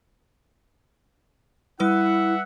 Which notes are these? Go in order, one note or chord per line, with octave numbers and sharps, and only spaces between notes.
G3 E4 B4 E5 F#5 E6